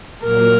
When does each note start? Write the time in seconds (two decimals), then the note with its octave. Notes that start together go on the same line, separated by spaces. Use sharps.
0.22 A#2 F#3 A#3 A#4